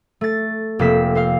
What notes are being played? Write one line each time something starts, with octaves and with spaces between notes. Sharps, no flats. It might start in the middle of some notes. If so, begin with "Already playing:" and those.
A3 A6
F1 A#3 C4 B6 E7
C4 C5 F5